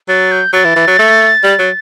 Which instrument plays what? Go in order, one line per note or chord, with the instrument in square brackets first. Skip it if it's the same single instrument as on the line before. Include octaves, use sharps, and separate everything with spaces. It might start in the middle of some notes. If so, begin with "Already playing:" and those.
[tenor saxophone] F#3 [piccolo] A6
[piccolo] G6
[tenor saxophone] F#3 [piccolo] A6
[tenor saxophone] E3
E3
F#3
A3
G3
F#3